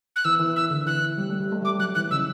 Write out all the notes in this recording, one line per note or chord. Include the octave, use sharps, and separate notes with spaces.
F#6
E3 E6
E3
E6
D3
E3 F#6
G3
A3
G3
A3
G3 D6
F#3 F#6
E3 F#6
C#3 E6